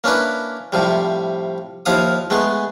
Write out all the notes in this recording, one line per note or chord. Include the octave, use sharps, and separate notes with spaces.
A#3 C#4 D4 E4 B4
A2 C3 F3 G3
D#2 F3 E4 F5 D#6
G#3 A3 B3 G#4